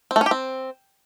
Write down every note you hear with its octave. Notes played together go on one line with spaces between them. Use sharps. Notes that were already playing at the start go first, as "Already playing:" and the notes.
C4
A3
C#4
G4
C4